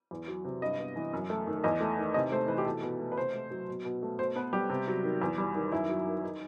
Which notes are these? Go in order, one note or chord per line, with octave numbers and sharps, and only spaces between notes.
E2
F#3
C3
G2 D#5
B3
E3
F#2
A3
D#3
E2 D#5
A3
D#3
C3 D#5
A3 C5
E3 B4
G4
B2 A4
B2
A3
B4
C3 C5
A3
F#3
B2
B2
A3
B2 C5
B3 B4
G3 G4
C3
F#3
D#3
E2
G3
D#3
F#2 E4
F#3
D#3
D#4